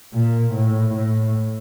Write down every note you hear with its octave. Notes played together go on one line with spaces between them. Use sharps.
A#2
A2
A2